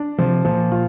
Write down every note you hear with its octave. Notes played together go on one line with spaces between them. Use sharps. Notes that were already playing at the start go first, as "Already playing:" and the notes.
Already playing: D4
C3 F3
A#2 F3
F4